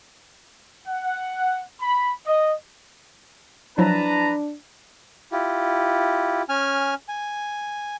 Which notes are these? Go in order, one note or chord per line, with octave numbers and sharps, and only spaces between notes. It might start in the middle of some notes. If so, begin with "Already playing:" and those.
F#5
B5
D#5
F3 F#3 D4 E4 B4 A5 A#5
E4 F4 G4
C#4 G#5 F6
G#5